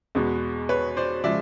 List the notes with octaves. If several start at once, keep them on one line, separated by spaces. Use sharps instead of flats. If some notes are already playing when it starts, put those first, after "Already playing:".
E2 B2 G#3 B3
B4 C#5
C5 D5
C#3 F3 G#3 D5 E5